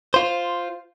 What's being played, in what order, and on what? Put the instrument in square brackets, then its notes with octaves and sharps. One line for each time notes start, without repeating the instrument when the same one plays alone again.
[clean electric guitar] F4 C5